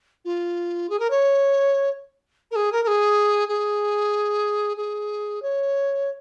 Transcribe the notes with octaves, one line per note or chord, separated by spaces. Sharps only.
F4
G#4
A#4
C#5
A#4
G#4
A#4
A#4
G#4
G#4
G#4
C#5